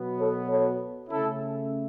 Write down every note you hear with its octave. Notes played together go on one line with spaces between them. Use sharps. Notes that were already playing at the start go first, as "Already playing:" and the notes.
Already playing: B2 F#3 B3
A4 C#5
A4 C#5
C#3 A3 C#4 E4 A4